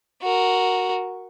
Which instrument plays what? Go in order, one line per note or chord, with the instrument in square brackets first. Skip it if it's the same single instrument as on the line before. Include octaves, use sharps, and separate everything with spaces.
[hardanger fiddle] F#4 A#4